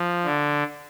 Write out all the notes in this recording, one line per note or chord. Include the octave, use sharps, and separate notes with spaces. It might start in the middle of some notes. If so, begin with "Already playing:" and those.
Already playing: F3
D3